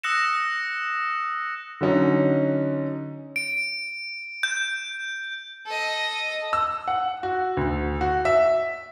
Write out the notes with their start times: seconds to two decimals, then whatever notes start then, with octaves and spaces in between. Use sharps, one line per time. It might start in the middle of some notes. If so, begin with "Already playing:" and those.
0.04 D#6 E6 F#6 A#6 C#7 E7
1.81 D3 F#3 C#4 D#4
3.36 D7
4.43 G6
5.66 A4 D#5
6.53 E6
6.88 F#5
7.23 F#4
7.57 D2
8.01 F#4
8.25 E5